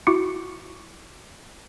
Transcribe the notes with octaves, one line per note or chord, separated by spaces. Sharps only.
E4 F#4 C#6 D6 C#7